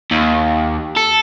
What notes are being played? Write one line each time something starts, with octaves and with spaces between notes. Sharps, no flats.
D#2
A4